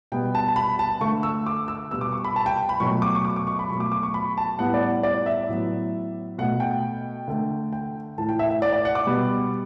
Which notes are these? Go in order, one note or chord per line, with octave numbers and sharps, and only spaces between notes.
B2 G3 B3 G5
A5
A5
B5
A5
D3 A3 C#6
E6
D6
E6
B2 G3 B3 E6
D6
C#6
B5
A5
G5
B5
B2 F#3 A3 C#6
D6
C#6
D6
D6
C#6
B5
B2 F#3 A3 C#6
D6
D6
C#6
B5
A5
A2 G3 B3 F#5
D5
D5
E5
A2 F#3 B3
B2 A3 F#5
G5
D3 A3
G5
A2 E3 A3 A5
G5
E5
E5
D5
D5
F#5
D6
B2 G3 B3